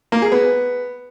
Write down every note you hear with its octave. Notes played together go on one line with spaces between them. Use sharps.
A#3
G#4
B3